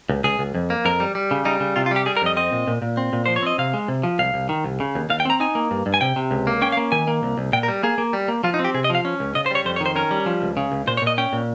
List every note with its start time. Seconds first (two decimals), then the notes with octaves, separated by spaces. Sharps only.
0.09 C#2
0.24 C#2 G#4
0.39 C#2
0.55 F2
0.70 A#3
0.85 F2 A#4
1.00 G3
1.15 G3
1.31 C#3
1.45 G3 D#4
1.60 C#3
1.76 C3 F4
1.86 F4
1.91 G3 G4
2.06 G3 G#4
2.17 A#4
2.22 F2 D#5
2.37 C4 D#5
2.52 A#2
2.67 A#2
2.82 A#2
2.97 C4
3.13 A#2
3.26 F3 C5
3.36 C#5
3.42 C4 D#5
3.58 C3 F5
3.74 G#3
3.88 C3
4.03 F3
4.19 C2 F5
4.34 C2
4.49 D#3
4.64 C2
4.80 C#3
4.95 D#2
5.10 D#2 F5
5.20 G5
5.25 C4 A#5
5.40 D#4 G#5
5.55 A#3
5.71 G2
5.86 G2
5.94 G#5
6.01 C3 G5
6.16 C3
6.31 C#2
6.47 A#3
6.62 C#4 G5
6.72 F5
6.77 A#3
6.92 D#3 G#5
7.07 A#3
7.23 C2
7.38 C2
7.53 A#2 G5
7.63 A#4
7.68 G3
7.83 A#3 G#4
7.98 A#3
8.13 G3
8.28 A#3
8.44 F3 F4
8.54 D#4
8.59 C4
8.64 G4
8.74 C3 G#4
8.84 D#5
8.90 F3 F5
9.05 C#4
9.20 C#2
9.35 C#3 D#5
9.46 C5
9.51 G3 C#5
9.65 F2 C5
9.76 C#5
9.81 D#3
9.86 C5
9.95 C#4 A#4
10.11 G3
10.26 F3
10.42 C#2
10.57 C#3
10.72 C#2
10.87 A#2 C5
10.97 C#5
11.02 A#2 D#5
11.18 C#4 G5
11.33 A#2